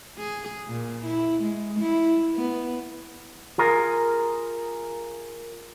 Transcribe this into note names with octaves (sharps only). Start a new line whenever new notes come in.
G#4
A#2
E4
G#3
E4
B3
F4 G#4 A#4